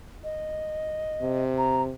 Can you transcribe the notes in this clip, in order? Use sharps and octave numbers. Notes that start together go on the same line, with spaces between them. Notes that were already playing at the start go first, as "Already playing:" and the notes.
D#5
C3
A#5